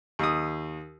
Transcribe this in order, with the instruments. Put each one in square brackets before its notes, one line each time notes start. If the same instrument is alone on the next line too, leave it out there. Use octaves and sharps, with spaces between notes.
[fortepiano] D#2 D#6